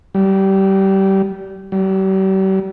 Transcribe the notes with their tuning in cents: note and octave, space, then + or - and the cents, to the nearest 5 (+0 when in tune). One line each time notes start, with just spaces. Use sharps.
G3 -25
G3 -45